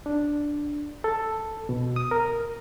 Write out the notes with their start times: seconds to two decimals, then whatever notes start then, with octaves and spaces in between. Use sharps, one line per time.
0.06 D4
1.04 A4
1.69 B2
1.96 D#6
2.11 A#4